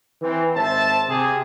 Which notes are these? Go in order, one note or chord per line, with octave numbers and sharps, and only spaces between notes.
E3 C4
G#1 C5 E5 A5
C3 G#4